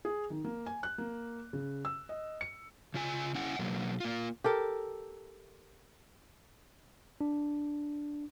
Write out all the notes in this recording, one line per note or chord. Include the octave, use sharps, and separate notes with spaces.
G#4
D#3
A#3
G#5
F#6
A#3
C#3
E6
D#5
C#7
C#3 F4 G#5
C#4 E4 F#5 G#5
B2 F#3 A#3
A#3 F4
G4 A4 A#4
D4